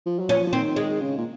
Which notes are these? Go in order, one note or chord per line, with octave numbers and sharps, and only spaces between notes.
F3
F#3
C#4
F3
F3
D#3 C4
G#3
C#3
A#2